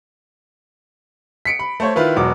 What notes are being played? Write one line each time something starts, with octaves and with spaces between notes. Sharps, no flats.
B6 C#7 D7
B5
A3 C5 C#5
D#3 E4 F4 B4
E1 B2 F#3 D6